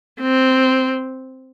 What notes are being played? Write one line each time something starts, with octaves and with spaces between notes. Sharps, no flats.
C4